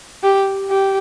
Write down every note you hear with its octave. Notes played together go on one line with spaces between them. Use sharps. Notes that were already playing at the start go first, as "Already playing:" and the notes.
G4
G4